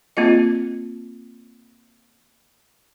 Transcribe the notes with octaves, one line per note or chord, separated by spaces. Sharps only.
A#3 C4 F4 D#5